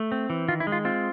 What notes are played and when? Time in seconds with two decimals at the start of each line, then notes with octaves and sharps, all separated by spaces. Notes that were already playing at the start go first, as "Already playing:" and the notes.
Already playing: A3
0.12 C4
0.30 E3
0.48 D#3 F4
0.60 E4
0.67 G#3
0.72 F4
0.85 C4 F4